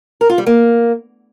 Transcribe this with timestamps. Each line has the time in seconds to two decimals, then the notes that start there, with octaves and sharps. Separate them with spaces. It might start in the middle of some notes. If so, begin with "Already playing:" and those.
0.21 A#4
0.29 F4
0.38 G3
0.46 A#3